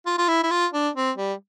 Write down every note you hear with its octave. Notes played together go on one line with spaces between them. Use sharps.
F4
F4
E4
E4
F4
D4
C4
G3